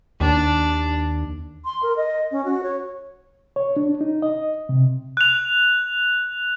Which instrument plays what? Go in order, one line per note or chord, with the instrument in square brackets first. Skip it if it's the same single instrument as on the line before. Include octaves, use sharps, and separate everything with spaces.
[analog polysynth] D#2 [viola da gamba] D4
[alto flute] C6
A#4
D#5
C#4
F#4
C#5
[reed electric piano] C#5
D4
D#4
D#5
C3
[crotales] F#6 F7